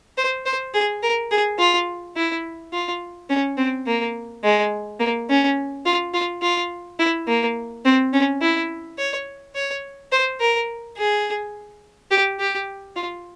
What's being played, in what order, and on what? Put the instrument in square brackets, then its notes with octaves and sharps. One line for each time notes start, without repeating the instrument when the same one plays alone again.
[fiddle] C5
C5
G#4
A#4
G#4
F4
E4
F4
C#4
C4
A#3
G#3
A#3
C#4
F4
F4
F4
E4
A#3
C4
C#4
E4
C#5
C#5
C5
A#4
G#4
G4
G4
F4